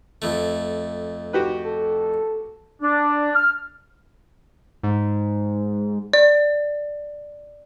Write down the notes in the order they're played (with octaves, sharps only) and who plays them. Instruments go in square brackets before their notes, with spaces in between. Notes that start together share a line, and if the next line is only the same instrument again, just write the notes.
[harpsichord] F2 A3
[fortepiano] F#4 G4 B4
[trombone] A4
[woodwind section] D4
F6
[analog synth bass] G#2
[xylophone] D5